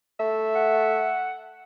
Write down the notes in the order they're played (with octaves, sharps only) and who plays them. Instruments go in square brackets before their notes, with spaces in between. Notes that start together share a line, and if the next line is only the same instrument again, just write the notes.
[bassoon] A3 [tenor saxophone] E5
[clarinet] F#5